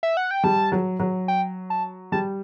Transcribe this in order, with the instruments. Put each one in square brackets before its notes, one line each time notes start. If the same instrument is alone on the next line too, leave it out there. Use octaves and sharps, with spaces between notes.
[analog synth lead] E5
F#5
G5
[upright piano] G3 [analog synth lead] A5
[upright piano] F#3
F#3
[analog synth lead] G5
A5
[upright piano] G3 [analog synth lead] A5